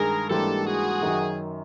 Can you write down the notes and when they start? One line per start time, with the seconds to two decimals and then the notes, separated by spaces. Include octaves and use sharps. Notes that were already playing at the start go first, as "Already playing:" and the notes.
Already playing: G2 D#3 G#3 G#4 A#4
0.30 G#2 E3 G3 A#3 D4 G4 A4
0.65 F#4 G#4
1.01 F#2 D#3 F#3